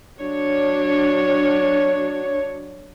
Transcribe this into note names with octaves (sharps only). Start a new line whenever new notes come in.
F#3 D4 C#5